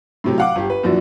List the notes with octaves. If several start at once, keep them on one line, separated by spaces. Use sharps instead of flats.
A2 C3 F#3
F5 F#5 D6
G1 G4
B4
F#2 A#2 E3 F3 D4 F#4